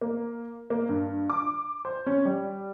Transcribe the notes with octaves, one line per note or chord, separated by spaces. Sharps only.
A#3
A#3
G2
D6
C5
C#4
G3